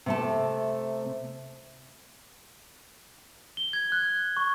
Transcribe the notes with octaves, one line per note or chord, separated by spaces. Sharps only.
C3 A3 A5
G7
G#6
F#6
C#6